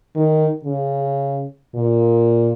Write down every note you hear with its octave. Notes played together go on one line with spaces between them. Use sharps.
D#3
C#3
A#2